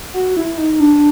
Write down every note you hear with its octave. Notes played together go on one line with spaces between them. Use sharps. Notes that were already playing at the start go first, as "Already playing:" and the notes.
F#4
E4
D#4
D4